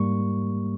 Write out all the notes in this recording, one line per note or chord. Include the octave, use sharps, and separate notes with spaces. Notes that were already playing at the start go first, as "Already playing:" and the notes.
Already playing: G#2 G3 A#3 C#6